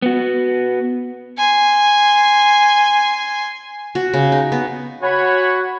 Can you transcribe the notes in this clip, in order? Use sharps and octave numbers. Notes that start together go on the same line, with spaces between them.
B3 F#4
G#5 C6
F#4
C#3
D#4
B3
F#4 C#5 F#5 G#5 B5